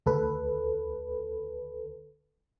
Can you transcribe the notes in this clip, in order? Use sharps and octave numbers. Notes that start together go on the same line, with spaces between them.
D2 A4 B4